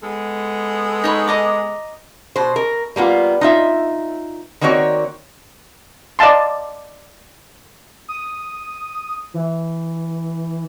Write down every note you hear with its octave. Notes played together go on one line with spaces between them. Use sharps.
G#3 B3 A4
D#4 C#5 B5
D#5 A#5 D6
B2 C5
A#4
G3 A#3 B3 F4
D#4 F4 E5
D#3 A#3 C4 F#4 C#5 D5
D5 D#5 F5 A5 C6
D#6
E3